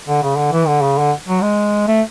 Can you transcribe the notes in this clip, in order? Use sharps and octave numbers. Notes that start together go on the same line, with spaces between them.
D3
C#3
D3
E3
D3
C#3
D3
F#3
G#3
A3